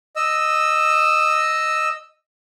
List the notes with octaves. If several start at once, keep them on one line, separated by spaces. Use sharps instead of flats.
D#5 E6